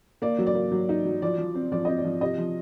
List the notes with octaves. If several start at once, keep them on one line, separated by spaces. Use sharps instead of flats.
A#3 D5
F#3
D5
A#3
F#3
D#4
F#3
F3 D5
F3
C4
F3 D5
C4 D#5
D5
F3
C3 D#5
F3